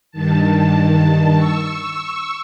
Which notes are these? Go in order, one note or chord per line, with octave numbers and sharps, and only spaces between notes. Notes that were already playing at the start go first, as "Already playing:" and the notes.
G2 D#3 A5
C#6 E6